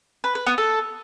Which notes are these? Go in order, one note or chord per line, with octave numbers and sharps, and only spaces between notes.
B4
B4
B3
A4